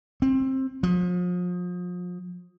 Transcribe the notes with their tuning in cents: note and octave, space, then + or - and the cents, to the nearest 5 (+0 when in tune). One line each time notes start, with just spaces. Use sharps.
C4 +20
F3 +35